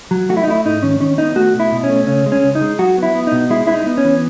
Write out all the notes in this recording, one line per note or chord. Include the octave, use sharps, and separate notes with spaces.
F#3
A3 F#4
E4
D#4
A3 E4
G#2 D#4
D#3 C#4
D#3 C#4
B3 D#4
A3 F#4
B2
E4
B2
C#4
A3
C#3 C#4
G#3
C#4
C#2
D#4
G#3
F#3 F#4
B3
E4
B3
B2 D#4
G#3 E4
B3 E4
D#4
B3
C#4
E3